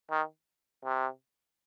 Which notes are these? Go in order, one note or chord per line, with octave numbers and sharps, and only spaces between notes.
D#3
C3